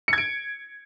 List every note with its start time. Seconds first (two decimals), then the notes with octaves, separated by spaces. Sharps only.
0.08 C#7
0.13 G#6
0.18 D7